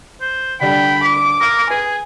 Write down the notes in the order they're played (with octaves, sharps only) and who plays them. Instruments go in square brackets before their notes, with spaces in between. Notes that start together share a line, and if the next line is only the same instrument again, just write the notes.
[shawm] C5
[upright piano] D3 G3 D4 [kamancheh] G5 [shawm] B5
[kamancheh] D6
[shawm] A#4 [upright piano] D#6
[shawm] G#4 [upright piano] B4 [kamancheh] G#5